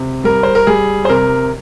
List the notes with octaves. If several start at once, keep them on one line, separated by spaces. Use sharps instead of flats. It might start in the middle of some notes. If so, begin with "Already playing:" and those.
Already playing: C3
G3 A#4
C5
A#4
G3 G#4
C5
C3 A#4